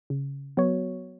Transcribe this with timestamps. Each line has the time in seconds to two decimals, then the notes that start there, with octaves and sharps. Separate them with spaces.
0.10 C#3
0.57 F#3 B3 F#4 C#5